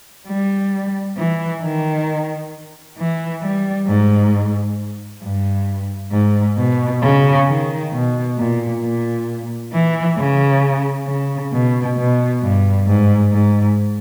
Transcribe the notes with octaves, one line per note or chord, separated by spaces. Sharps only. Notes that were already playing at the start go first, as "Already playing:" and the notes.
G3
E3
D#3
E3
G3
G#2
G2
G#2
B2
C#3
D#3
B2
A#2
A#2
E3
C#3
C#3
B2
B2
G2
G#2
G#2